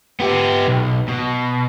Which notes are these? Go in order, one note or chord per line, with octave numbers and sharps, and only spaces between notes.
B3 G4
B1
B2